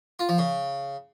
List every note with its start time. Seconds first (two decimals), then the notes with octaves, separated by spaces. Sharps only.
0.19 F4
0.29 F3
0.38 C#3